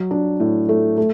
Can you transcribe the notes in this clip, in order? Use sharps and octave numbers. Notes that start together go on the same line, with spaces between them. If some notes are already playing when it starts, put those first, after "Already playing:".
Already playing: F#3
D4
A2
A3
A3